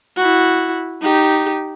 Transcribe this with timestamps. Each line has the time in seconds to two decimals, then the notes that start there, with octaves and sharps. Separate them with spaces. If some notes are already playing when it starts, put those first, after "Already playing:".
0.16 E4 F#4
1.02 D#4 G4